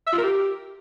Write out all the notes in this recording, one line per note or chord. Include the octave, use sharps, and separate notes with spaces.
E5
F4
A#4
G4